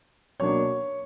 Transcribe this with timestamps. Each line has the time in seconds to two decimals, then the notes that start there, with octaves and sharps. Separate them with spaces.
0.40 B2 F#3 A#3 D4 C#5 C#6